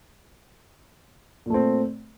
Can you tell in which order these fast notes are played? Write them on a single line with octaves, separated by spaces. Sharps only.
A#2 A3 C4